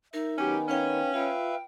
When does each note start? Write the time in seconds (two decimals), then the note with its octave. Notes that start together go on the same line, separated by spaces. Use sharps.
0.14 D#4 A#4 E5
0.38 D#3 F#3 B3 C#4 G4 G#5
0.69 C#4 B4 F5 G5
1.14 F4 B4 E5 F5 G5